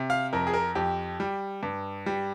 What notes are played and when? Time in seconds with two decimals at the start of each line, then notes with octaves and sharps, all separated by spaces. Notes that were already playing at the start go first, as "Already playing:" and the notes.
Already playing: C3
0.10 F5
0.33 F2 A#4
0.47 G#4
0.53 A#4
0.75 F2 G4
1.20 G3
1.63 G2
2.06 G3